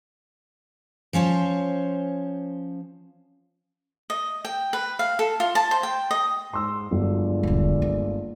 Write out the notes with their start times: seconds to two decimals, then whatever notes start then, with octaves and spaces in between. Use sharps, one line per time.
1.13 F3 C#4 C5 C#5
4.10 D#5
4.45 G5
4.73 B4
4.99 F5
5.19 A4
5.40 F4
5.55 A5
5.71 C5
5.83 G5
6.11 D#5
6.53 G#2 C6 E6
6.91 G1 F#3 G#3 D4 D5
7.43 D#1 D3
7.82 A#3